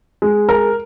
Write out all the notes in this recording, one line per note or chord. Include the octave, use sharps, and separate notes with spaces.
G#3
A#4